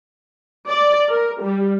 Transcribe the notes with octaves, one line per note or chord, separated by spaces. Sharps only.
D5
A#4
G3